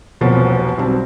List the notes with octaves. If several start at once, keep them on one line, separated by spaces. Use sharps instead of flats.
E1 C2 B2 F3 A#3 C#5
B1 G3 C4